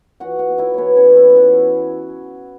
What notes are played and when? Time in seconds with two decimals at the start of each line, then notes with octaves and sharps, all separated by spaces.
0.20 E3 F#4 F#5
0.39 F#4 F#5
0.50 B3
0.58 E4 E5
0.74 E3 B3 B4 C#5
0.97 C#4 C#5
1.07 B3
1.16 E4 E5
1.29 E5
1.36 E3 F#4 F#5